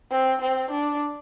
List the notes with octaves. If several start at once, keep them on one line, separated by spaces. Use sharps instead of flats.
C4
C4
D4